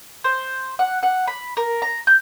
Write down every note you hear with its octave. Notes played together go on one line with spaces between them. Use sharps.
C5
F#5
F#5
B5
A#4
A#5
G6